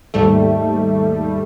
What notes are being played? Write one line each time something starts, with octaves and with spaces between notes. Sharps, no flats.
D#2 G#2 G3 A3